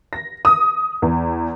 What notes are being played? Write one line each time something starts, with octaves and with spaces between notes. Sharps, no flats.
A#6
D#6
E2